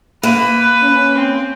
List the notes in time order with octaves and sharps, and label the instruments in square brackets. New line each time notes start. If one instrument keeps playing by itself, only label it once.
[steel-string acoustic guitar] A#3 [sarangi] B4
[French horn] C#4
[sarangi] C4